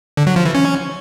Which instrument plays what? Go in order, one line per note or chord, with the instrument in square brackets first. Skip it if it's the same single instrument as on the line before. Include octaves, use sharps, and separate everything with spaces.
[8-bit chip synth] D3
F#3
F3
E3
C#4